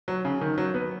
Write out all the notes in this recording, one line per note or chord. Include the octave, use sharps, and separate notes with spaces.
F#3
C#3
D#3
F#3
B3